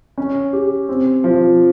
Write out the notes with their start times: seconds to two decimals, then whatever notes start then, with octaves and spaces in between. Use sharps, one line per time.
0.18 C#4
0.53 G4
0.89 C4
1.24 F3